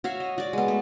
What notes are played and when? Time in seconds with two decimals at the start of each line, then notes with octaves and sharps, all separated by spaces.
0.04 F#4 C#5 E5 F5
0.20 D#5
0.38 F#4 D5
0.53 G#3 B3
0.68 A3